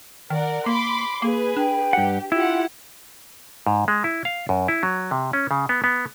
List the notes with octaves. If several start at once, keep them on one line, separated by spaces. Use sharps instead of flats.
D#3 A#4 D5 F#5
A#3 B5 C6 D6
A#3 G#4 B4
D4 G5
G2 G4 F#5
E4 F4 G4 F#5
G#2
G#3
E4
F5
F#2
E4
F#3
C3
C#4
C#3
B3
B3